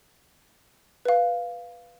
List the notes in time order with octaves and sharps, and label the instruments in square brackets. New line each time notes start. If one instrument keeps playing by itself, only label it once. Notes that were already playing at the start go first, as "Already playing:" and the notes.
[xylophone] B4 F5